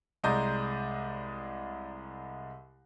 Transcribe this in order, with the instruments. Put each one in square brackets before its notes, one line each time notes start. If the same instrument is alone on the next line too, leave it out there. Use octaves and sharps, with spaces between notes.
[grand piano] C2 G#3 D5 D#5 A#5 G6